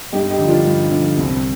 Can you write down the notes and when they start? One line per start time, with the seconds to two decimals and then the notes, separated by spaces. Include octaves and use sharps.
0.13 G2 D#4 G4
0.30 D#4 G4
0.39 D3 F3
0.47 D4 F4
0.65 G2
0.91 D3 F3
1.17 C2 C4